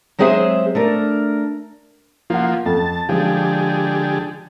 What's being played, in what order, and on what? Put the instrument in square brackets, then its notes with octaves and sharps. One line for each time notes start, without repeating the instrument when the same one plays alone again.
[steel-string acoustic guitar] F#3 G#3 C4 G#4 C5 E5
A3 D4 A#4
[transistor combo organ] F3 A#3 [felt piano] F4 F#5
[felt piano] F2 [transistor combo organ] A5
[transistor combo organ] D3 G4 G#4 [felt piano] F3 G#3